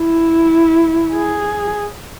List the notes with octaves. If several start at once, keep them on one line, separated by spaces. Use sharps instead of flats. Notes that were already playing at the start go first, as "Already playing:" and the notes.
Already playing: E4
G#4